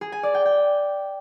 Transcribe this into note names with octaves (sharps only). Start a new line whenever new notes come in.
G#4
G#5
D5
G5
G5